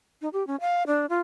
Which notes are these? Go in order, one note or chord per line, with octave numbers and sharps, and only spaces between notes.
D#4
G4
C#4
F5
D4
F4